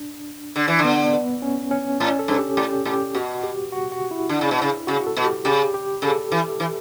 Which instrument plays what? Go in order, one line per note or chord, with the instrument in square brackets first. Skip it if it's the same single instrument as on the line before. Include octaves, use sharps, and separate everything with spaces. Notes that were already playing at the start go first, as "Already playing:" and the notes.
Already playing: [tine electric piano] D4
[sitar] D3
E3
D3
[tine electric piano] B3
B3
C#4
C#4
[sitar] A2 [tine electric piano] C#4
[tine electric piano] A4
[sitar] G2
[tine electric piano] G4
[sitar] A2 [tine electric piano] G4
[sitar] A2 [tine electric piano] G4
[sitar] B2 [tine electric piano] F#4
[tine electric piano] G4
F#4
F#4
E4
[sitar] D3
C#3
B2
C#3
[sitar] C#3 [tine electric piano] F#4
[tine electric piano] A4
[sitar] B2
[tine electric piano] G4
[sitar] C#3 [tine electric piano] G4
[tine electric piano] G4
[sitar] C#3 [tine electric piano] A4
[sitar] E3
E3